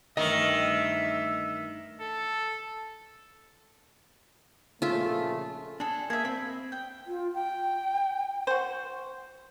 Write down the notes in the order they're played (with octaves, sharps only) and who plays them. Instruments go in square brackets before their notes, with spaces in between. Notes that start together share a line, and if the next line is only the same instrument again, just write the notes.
[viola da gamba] G2 E3 A3 [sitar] D#3 [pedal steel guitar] D#5 C#6 [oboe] E5
[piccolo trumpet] A4
[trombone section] A#1 C#3 A3 [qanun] F4 E5
[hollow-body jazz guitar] D4 [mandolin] G#4 A4
[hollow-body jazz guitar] A#3 [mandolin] G#4 E5
[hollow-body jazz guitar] C4 [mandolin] B5
[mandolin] G5
[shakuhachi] F4
G5
[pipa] F#4 C5